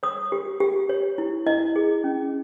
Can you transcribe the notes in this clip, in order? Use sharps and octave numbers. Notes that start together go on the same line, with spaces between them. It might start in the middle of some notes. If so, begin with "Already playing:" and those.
C#5 D#6
G4
G4
C#5
E4
E4 D#5
G#4
C#4